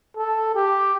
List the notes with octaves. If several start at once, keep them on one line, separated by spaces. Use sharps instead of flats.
A4
G4